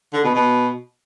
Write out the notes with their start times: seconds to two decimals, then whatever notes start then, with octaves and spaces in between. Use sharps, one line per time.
0.14 D3
0.24 B2
0.35 B2